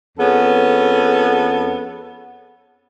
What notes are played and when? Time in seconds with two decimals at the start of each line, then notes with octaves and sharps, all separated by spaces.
0.18 F2 B3 C#4 G#4 A4